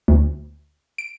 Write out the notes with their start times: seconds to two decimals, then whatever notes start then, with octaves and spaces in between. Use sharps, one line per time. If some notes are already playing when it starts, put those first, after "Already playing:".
0.08 D2
0.98 D7